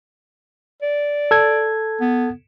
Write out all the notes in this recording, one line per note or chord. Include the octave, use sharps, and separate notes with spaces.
D5
A4 G#6
B3